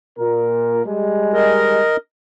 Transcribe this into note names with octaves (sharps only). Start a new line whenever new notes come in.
A#2 A#4
G3 G#3
A#4 D#5